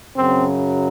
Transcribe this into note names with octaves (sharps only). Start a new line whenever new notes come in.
F#2 C#3 F#3 C4